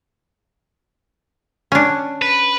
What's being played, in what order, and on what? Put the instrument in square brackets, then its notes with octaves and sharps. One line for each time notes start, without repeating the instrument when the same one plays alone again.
[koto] C#4 D4
[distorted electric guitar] B4